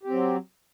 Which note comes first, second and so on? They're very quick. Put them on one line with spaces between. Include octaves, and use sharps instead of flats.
G4 C4 F#3